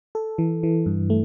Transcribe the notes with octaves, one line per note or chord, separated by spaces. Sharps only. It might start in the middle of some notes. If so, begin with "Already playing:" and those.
A4
E3
E3
G2
A3